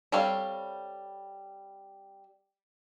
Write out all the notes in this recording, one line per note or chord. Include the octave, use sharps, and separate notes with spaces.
G3 C4 A4 C#5 F5